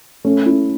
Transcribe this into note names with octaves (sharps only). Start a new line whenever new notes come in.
A3 C#4
C#4 E4